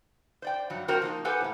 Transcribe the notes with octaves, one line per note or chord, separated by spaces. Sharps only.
C5 D5 G5
G2 F#3
C3 F3 F#4 A#4 C5 G5
F3 A#3 D#4
G4 A4 B4 C5 F#5 G#5
A2 A#3